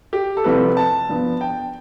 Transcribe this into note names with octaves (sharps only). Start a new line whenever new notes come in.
G4
A4
C2 C3 F3 A3 C4 B4
A5
G2 F3 B3
G5